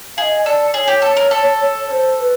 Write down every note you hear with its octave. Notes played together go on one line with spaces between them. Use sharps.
G#4 D#5 F5
A4 D5
G#4 C#5
G4
A4
A#4
A4
C#5
C5
C5
B4